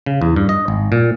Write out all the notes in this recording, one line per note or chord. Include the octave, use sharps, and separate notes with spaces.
C#3
E2
G2
D#5
G#1
A#2